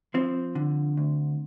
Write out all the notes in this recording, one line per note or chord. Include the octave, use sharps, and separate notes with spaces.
F3 C4
D3
D2